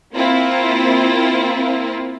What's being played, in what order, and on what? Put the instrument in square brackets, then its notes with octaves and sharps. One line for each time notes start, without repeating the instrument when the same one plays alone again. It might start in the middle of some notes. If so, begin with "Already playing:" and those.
[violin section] A#3 C4 E4 F4